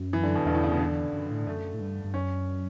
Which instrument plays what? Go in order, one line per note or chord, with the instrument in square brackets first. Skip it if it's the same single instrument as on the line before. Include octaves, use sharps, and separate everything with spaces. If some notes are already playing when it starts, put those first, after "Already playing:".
Already playing: [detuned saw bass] F#2
[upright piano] E3
D3
B2
[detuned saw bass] E2 [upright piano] G2
[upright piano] A2
C#3
B2
D3
[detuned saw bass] F#2
A2
[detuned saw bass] F#2 [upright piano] A3
[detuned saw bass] A2
G2
G2
[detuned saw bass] F#2 [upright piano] C#4